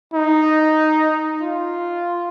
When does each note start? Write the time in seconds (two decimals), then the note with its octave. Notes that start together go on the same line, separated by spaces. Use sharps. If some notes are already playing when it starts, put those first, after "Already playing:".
0.14 D#4
1.41 F4